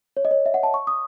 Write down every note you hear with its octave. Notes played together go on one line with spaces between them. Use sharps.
C#5
D#5
C#5
E5
F#5
A5
C#6
D#6